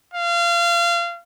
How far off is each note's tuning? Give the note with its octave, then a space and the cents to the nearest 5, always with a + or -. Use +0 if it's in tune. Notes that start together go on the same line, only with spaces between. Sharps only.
F5 -25